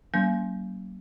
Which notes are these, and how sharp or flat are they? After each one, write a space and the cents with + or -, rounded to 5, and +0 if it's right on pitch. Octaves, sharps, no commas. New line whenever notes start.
F#3 +45 A#3 +10 C#4 +35